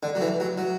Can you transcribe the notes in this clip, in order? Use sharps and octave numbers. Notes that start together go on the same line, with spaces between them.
D3
F#3
E3
F#3
F#3